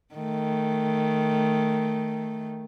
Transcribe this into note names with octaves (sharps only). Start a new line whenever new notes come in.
D#3 A3